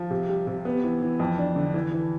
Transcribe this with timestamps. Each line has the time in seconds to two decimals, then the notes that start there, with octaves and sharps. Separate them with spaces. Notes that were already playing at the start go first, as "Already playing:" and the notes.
Already playing: F3
0.10 C3
0.29 G3
0.47 C3
0.65 B3
0.84 E3
1.02 E3
1.20 F2
1.38 D4
1.56 D3
1.74 E3
1.92 E3